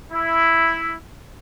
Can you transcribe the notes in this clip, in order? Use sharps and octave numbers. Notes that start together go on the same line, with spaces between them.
E4